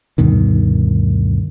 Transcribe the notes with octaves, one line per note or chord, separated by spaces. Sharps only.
D2 G2 B2 D#3